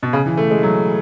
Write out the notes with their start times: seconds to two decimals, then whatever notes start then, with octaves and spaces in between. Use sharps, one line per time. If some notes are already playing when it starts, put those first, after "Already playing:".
0.03 B2
0.13 C#3
0.26 E3
0.37 A3
0.51 G#3
0.63 F#3